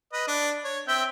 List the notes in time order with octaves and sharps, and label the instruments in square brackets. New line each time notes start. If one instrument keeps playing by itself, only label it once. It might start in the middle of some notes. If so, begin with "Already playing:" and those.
[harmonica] B4 D#5
D4
C#5
C4 E5 G5